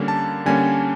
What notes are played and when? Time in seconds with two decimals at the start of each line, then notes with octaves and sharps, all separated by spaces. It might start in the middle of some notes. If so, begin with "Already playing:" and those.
Already playing: D3 G3 A#3 C#4
0.08 A5
0.46 D3 G3 A#3 C#4 G#5